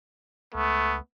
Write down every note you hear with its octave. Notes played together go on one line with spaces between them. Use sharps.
C#2 A3 B3